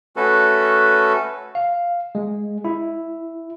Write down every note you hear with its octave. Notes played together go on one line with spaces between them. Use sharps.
A3 C#4 F#4 A4 B4
F5
G#3
E4